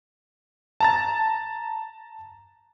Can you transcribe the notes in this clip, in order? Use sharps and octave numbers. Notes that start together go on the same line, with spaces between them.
A5 A#5 A6